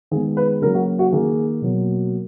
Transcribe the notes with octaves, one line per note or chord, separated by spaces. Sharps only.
D#3 G#3 B3 G#4
B4
C#3 F#3 A#3 A#4
F#4
F#4
D#3 A#3 G#4
B2 F#3 A#3